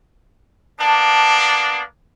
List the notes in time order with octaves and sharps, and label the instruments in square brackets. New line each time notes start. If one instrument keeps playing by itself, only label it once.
[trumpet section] A#3 B3 D4 [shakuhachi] A5